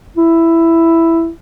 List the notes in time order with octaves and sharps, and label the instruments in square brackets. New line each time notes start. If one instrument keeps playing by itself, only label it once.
[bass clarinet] E4